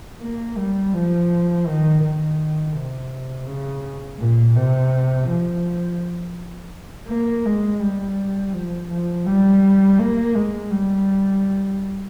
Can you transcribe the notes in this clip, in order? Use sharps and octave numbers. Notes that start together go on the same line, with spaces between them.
A#3
G3
F3
D#3
D#3
C3
C#3
A#2
C3
F3
A#3
G#3
G3
F3
F3
G3
A#3
G#3
G3